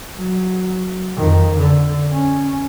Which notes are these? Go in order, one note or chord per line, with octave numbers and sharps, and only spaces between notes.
F#3
F2 D#3
D3
C#4